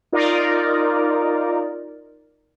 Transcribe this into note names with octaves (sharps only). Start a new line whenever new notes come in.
D#4 F4 A#4 D5